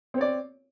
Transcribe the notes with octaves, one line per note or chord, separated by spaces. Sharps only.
C4 C#5 D5